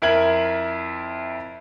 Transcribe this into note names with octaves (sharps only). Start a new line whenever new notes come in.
F2 E4 A#4 E5 G#6 F#7